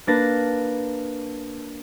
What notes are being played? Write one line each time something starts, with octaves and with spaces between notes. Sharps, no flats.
A#3 D4 B4 A6 A#6